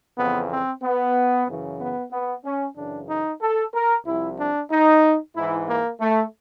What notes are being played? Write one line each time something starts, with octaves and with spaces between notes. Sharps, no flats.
F2 C#3 E3 B3
C4
B3
F#2 C#3 E3
B3
B3
C#4
F#2 C#3 E3 D4
D#4
A4
A#4
C2 C3 F3 E4
D4
D#4
G#2 E3 E4
A#3
A3